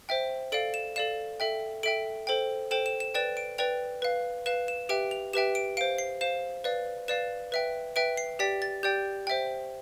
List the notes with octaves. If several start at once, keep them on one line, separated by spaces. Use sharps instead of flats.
C5 E5 G5
A4 D5 F5 D7
E7
A4 D5 F5 E7
A4 E5 G5
A4 E5 G5 D7
A4 C5 G5
A4 C5 G5 E7
E7
E7
B4 D5 G5 E7
D7
B4 D5 G5 F7
B4 F5
B4 F5 E7
E7
G4 B4 E5 G5 D7
F7
G4 B4 E5 G5 E7
D7
C5 F5 D7
C7
C5 F5 E7
B4 D5 F5
B4 D5 F5 E7
B4 E5 G5
B4 E5 G5 D7
C7
G4 D5 G5 B6
A6
G4 D5 G5 G6
C5 E5 G5